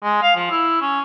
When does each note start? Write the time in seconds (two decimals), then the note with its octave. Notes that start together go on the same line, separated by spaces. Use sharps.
0.03 G#3
0.22 F5
0.36 F3
0.51 E4
0.81 C#4